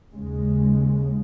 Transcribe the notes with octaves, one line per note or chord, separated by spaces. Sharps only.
D#2 C#3 G#3